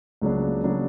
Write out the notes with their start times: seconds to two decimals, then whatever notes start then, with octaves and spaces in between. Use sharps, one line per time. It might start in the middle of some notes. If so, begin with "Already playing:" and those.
0.22 C#2 C#3 F#3 A#3 D4
0.64 C#3 F#3 A#3 D4